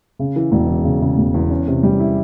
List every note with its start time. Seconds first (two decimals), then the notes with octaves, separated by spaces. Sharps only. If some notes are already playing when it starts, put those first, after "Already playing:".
0.19 C#3
0.36 E3
0.52 E1
0.69 E3
0.84 C#3
1.01 C#3
1.18 E1
1.34 E2
1.50 C#4
1.68 C3
1.83 G3
2.00 E4